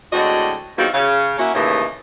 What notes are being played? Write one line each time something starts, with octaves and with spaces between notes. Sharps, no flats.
A2 D3 G#3 C4 F#4 D#5
E2 G3 C4 D#4 F#4 F5
C#3 F5
A#3 C#4 E4 F#4
D#2 A2 C#3 E3 D#4 D#5